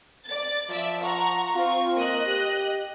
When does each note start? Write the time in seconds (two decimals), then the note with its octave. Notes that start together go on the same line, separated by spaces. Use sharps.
0.26 D5 A6
0.70 F3 D5 E5
1.00 F#5 A#5 C#6
1.55 C4 F4 C#6
1.97 A#3 D#5 F#6
2.27 G4